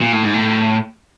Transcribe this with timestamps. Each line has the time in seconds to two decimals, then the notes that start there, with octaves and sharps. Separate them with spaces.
0.01 A#2
0.12 A2
0.23 G#2
0.34 A2